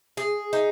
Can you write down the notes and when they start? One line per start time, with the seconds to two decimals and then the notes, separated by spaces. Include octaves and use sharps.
0.17 G#4
0.53 D#4